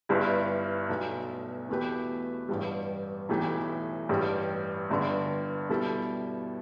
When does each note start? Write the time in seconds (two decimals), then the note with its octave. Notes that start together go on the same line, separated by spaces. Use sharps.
0.09 G1 G2 G3 E4
0.89 B1 B2 A3
1.69 E2 B2 A3 G4 B4
2.49 A1 G2 G3
3.29 B1 A2 E3 A3 G4
4.09 A1 G2 G3
4.90 G1 G2 D3
5.69 B2 G3 E4 A4